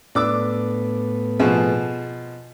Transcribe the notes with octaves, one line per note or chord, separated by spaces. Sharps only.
A2 B3 D4 D6 E6
B2 F3 G#4